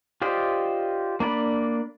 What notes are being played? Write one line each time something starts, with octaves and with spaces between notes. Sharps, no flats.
F4 G4 C5 D5 D#5
A#3 D4 D5 B5